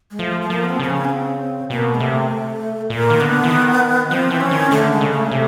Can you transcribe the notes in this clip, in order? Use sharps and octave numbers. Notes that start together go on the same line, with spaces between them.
G#3
F3 A3
A3
F3 A#3
B3
C4
C#3 C4
C#4
B3
C4
B2 A#3
G#3
C3 A3
A#2 A#3
D#3
D3 B3
E3
D#3
F3 C4
E3
C#4
D#3
D3 A3
G#3
C#3
A3
C3